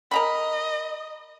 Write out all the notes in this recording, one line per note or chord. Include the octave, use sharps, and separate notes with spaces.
A#4 D#5 A#5 B5